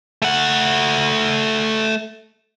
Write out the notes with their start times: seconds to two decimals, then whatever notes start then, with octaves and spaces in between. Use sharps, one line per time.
0.22 A3 F#5